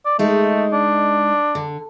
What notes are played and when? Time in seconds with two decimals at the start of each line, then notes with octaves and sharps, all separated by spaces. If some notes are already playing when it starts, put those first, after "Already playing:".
0.06 D5
0.19 G#3 A3 D#4
0.73 D4
1.55 D3